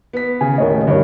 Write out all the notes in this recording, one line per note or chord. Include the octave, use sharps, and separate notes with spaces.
B3 B6
C#3 G#5
D#2 A2 A#4 C#5 D#5
G2 D3 C#5